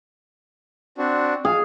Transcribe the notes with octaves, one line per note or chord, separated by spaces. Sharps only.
C4 D4 F#4
G#4 F5